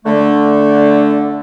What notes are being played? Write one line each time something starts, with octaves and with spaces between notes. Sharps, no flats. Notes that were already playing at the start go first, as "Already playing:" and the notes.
D3 A3